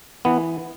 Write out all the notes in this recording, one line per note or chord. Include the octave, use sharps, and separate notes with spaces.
E3 B3